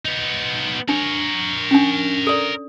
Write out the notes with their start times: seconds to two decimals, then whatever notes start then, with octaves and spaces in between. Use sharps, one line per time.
0.06 B3 D#4
0.89 D4 A#4 C#5
1.71 C#4 D4
2.27 A4 D5